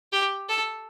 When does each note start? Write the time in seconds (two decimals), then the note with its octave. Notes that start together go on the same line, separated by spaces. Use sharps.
0.12 G4
0.49 A4